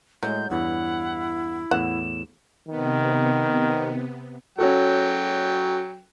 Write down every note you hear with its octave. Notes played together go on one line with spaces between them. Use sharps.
A2 F#3 G#3 G6
E2 G2 E4 F#5
E2 A2 F#5 E7
C3 D#3 B3
F#3 C#4 F#4 A4 G5